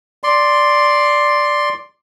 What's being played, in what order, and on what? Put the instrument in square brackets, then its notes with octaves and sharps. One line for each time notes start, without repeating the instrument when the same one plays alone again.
[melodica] D5 C6